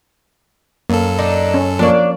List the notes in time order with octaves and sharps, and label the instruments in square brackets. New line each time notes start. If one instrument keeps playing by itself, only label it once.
[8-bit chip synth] F#2 A4 [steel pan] A#3
[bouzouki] D4 D#4
[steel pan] C#4
[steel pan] F3 A#3 C#5 [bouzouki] D4 D5